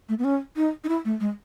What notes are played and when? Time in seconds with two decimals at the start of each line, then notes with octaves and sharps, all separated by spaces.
0.09 A3
0.19 B3
0.24 C#4
0.56 D#4
0.84 D#4
0.89 E4
1.05 A3
1.20 G#3